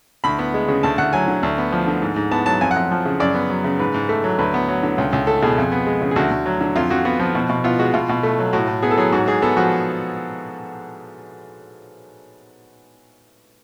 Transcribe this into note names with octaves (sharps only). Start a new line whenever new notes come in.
D2 B5
B3
G#3
C#3
D2 A5
D2 F#5
F#3 G#5
D3
D2
B3
F3
D3
G#2
G#2
B3 A5
F#3 A5
F2 G#5
F#5
F2
F3
C#3
F#2 D5
B3
F#3
C#3
G#2 B4
G#2
A3
F#3
D2 B4
B3
F#3
D3
C#2
C#2
A3 A4
B2 G#4
F2
B3
G#3
C#3
G#4
D2 F#4
D2
F#3
D3
F2 F4
F2 F#4
B3 F#4
F3
B2
B2
B3 F4
G#3 F#4
B2 F4
B2
A3
F#3
A2 F#4
A2
B3 G#4
A4
F#3 G#4
G#2 F#4
G#2 G#4
B3 A4
F3 F#4